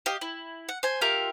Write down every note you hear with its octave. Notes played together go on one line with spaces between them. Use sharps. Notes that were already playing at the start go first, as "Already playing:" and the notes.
G4 D#5 F5
E4
F#5
C5 G#5
F4 G4 A#4 E5